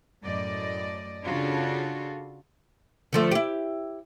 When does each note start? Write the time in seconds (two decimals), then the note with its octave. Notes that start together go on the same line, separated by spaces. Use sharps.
0.24 F#2 A2 D5 D#5
1.25 C#3 D4 F4 F#4 A4
3.13 D3 F3 A3
3.31 E4 G4